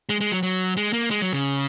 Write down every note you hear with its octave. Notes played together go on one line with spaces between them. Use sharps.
G#3
G#3
F#3
F#3
G#3
A#3
G#3
F#3
C#3